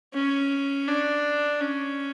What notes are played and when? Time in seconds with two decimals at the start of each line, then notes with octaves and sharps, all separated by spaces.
0.14 C#4
0.88 D4
1.61 C#4